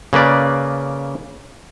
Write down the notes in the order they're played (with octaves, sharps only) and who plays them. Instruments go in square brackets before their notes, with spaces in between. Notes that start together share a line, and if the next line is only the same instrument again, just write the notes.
[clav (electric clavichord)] C#3 A#3 B4 D5